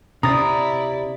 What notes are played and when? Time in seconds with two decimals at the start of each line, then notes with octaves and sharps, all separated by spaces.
0.23 C3 E4 D5 A#5 D#6 A6